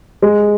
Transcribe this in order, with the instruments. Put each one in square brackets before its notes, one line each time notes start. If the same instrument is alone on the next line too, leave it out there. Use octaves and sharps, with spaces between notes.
[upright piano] G#3